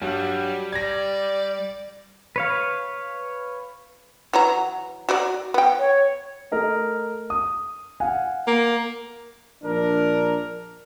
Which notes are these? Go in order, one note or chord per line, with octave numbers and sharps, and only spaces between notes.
G2 F#3 G3
D5 G#6 A#6
B4 C#5 F5
E3 F#3 A#5
F#3 F#4 D5
B3 G5
C#5
A3 A#4 D#5
D#6
F5 F#5 G#5
A#3
A#1 D4 A#4